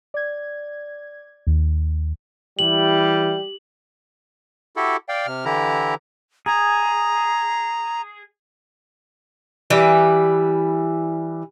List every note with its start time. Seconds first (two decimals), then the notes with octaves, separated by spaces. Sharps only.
0.14 D5 G#6
1.47 D#2
2.59 E3 G3 E4 G4 F#7
4.76 E4 F#4 G4 A4
5.09 D5 F5 G5
5.27 C3 F6
5.45 D3 E3 E4 G4 A#5
6.46 G#4 A#5
9.70 E3 G3 B4